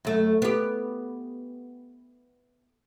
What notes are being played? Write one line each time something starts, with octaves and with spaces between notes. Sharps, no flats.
F#2 A3
B3 G4